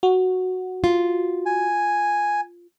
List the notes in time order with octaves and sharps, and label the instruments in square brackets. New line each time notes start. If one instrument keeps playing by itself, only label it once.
[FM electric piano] F#4
[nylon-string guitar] F4
[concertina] G#5